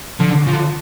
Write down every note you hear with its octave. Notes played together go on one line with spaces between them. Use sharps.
D3 F3
D3
C#3 F3
D3